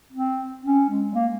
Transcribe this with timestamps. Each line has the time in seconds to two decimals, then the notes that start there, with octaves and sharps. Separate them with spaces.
0.13 C4
0.64 C#4
0.89 G#3
1.14 A#3